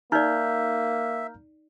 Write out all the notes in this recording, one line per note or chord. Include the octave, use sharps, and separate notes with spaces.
A#3 D#4 D5 E5 A#5 F6 G6